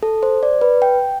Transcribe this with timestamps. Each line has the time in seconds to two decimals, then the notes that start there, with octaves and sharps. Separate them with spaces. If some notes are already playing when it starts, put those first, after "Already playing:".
0.03 A4
0.23 C5
0.43 D5
0.61 B4
0.82 G5